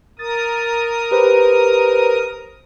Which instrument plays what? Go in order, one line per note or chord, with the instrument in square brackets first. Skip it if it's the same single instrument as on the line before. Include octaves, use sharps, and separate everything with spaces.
[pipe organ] A#4 D#6 [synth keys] A6
[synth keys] G4 B4 C5